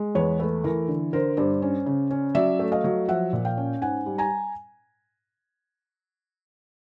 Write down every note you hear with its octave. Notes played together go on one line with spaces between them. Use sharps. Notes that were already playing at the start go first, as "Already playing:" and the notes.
Already playing: G#3
E2 B4 C#5
A3 B4
E3 A#4
D3
D3 A#4 C5
G2 C5 D5
C#4
C#3
C#4
F#3 D5 E5
A3
D#5 F5
F#3
F3 E5 F#5
A#2
F5 G5
C#4
G#2 F#5 G#5
G3
G#5 A#5